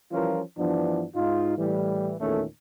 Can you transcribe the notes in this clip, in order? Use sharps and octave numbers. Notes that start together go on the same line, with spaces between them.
E3 F3 G3 C#4 F4 A#4
G2 E3 F3 B3 D4
G#2 D#4 F4
A2 E3 G3
E2 A#2 D#3 A3 C#4 A4